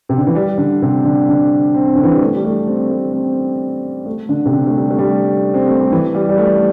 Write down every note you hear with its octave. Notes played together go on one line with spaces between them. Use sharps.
C3
D3
E3
G3
D3
C3
D3
D3
C4
D3
E3
G3
A3
G3
A3
C4
A3
C4
A3
D3
C3
D3
A3
G3
A3
G3
C4
A3
G3
E3
G3
G3
A3